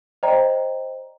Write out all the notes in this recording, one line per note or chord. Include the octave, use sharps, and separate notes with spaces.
C5 D5 D#5 G5 A#5